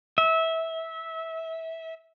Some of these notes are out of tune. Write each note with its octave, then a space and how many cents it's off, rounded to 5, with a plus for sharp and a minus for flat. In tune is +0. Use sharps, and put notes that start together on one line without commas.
E5 -20